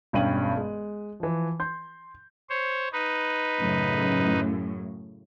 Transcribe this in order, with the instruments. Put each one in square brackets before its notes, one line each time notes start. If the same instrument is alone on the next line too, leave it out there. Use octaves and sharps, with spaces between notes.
[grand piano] E1 G2 C#4 G5 D#7 F#7
G#3
E3 F3
C6 G6
[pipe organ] C5 C#5
D#4 B4
[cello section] F#2 A2 C#3